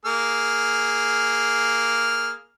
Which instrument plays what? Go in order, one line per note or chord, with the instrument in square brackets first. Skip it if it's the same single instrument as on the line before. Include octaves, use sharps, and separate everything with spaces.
[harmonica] A#3 G#4 F6